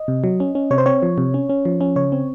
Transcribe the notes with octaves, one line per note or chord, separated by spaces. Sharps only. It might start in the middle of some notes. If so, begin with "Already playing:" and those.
Already playing: D#5
C3
F#3
C#4
C#4
C3 C#5
C5
C4 C#5
F3
C3
C#4
C#4
F3
C#4
C#3 C#5
C4